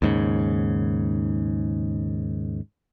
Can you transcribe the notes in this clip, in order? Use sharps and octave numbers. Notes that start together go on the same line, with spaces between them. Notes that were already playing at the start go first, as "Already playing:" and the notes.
D#2 G#2 C#3